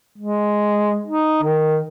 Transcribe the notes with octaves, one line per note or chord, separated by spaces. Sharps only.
G#3
D#4
D#3